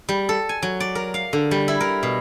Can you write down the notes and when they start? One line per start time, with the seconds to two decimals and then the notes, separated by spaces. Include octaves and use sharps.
0.09 G3
0.29 A4
0.49 G#5
0.62 F#3
0.80 D5
0.95 A#4
1.14 F5
1.33 D3
1.51 G3
1.68 E4
1.80 A#4
2.03 B2